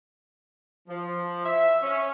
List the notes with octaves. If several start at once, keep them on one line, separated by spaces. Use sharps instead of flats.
F3
E5
C#4